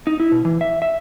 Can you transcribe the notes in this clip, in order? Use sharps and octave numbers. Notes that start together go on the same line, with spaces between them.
D#4
E4
B2
E3
E5
E5